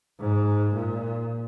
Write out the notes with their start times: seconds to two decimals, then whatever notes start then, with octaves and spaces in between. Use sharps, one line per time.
0.20 G#2
0.74 A#2